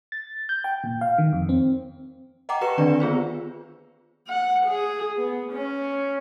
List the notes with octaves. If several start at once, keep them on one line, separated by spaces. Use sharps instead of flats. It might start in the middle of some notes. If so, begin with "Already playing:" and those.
A6
G6
G5
A#2
F5
D#3
F2
C4
D#5 F#5 G5 A#5 D6
G4 B4 C#6 C#7 E7
D3 D#3 C4 D4 B4 D5
B3 F4 G#4 C5
F#5
G#4
B3
C#4